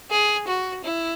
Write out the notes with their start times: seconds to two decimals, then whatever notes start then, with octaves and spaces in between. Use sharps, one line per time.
0.11 G#4
0.47 F#4
0.84 E4